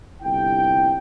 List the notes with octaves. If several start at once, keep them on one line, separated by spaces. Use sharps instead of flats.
G1 C2 C3 E4 G5